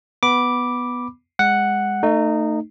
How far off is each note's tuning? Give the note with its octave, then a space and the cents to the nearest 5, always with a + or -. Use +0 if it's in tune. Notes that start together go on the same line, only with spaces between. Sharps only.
B3 +0 B5 -10 D6 +0
G#3 -20 F#5 +0
A3 +25 D#4 -20